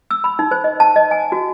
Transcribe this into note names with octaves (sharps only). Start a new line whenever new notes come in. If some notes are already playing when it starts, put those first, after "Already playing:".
E6
B5
D#4
C5
D#5
A5
D#5
G#5
F#4